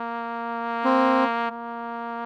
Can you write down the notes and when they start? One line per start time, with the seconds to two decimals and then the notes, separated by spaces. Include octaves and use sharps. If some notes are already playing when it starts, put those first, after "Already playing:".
Already playing: A#3
0.84 C4
1.51 A#3